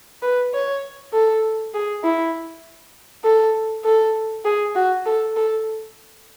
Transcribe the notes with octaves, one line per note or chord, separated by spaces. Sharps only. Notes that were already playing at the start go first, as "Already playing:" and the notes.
B4
C#5
A4
G#4
E4
A4
A4
G#4
F#4
A4
A4